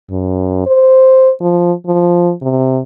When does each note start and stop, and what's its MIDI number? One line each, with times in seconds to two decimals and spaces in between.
0.10 0.66 42
0.66 1.31 72
1.41 1.72 53
1.86 2.33 53
2.42 2.81 48